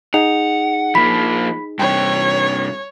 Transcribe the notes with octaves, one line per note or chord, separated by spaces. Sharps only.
D#4 G#4 F#5 F7
F3 A#3 B5 B6
G2 C3 C#5 G5